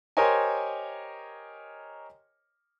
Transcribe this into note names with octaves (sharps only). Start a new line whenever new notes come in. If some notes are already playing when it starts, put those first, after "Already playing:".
G4 A#4 C5 C#5 D#5 G#5